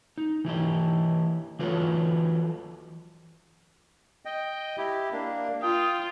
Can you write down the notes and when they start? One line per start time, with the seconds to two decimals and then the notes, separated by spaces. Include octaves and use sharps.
0.18 D#4
0.45 E3 E4 G4 D#5
1.59 E3 F#3 F4 A4 B4 C#5
4.25 D#5 G5
4.78 E4 G4
5.12 A#3 D4
5.62 F4 G5 D#6